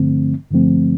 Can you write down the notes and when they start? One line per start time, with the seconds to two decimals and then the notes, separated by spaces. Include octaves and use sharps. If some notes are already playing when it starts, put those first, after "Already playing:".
Already playing: G2 D3 F3 A3 C4
0.51 G2 D3 F3 A3 C4